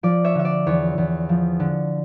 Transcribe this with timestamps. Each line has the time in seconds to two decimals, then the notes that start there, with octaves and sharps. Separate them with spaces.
0.03 F3 D5
0.24 C#5 E5
0.35 D3 E5
0.45 D5
0.67 E2 C#5
0.98 E2
1.29 F3
1.60 D3